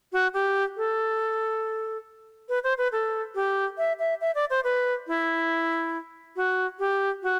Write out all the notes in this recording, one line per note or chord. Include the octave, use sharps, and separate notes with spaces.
F#4
G4
A4
B4
C5
B4
A4
G4
E5
E5
E5
D5
C5
B4
E4
F#4
G4
F#4